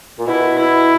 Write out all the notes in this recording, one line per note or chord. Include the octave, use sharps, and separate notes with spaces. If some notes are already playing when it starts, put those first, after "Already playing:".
A#2
B2 E4
E4